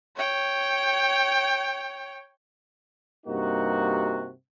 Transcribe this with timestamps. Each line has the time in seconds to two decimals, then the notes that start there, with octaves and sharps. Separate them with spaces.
0.17 C#5 G5
3.26 G2 C3 A#3 D#4 F#4